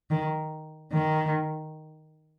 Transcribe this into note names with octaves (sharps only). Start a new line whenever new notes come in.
D#3
D#3